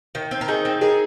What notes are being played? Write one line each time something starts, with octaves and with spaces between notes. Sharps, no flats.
D#3
C4
A#4
D#3 D#4 G#4
C4
D#3 D#4 G#4